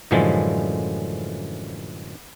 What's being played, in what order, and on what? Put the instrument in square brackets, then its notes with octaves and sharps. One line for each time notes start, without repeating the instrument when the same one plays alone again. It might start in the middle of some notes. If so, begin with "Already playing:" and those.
[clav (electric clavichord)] F#2 A2 D3 E3 F3 G#3